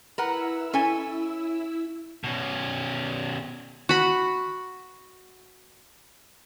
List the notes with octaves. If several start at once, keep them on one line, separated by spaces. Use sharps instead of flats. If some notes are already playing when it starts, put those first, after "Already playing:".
E4 A#4 B4 F#5 E6
C#4 A4 G#5
B2 C#4
F#4 B5